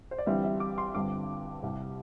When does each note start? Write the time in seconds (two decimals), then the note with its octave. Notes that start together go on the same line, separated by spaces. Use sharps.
0.11 C5
0.18 D5
0.26 G1 G2 E3 G3 C4 E5
0.44 E5
0.60 D6
0.78 C6
0.95 G1 G2 D3 C4 D6
1.63 C2 C3 G3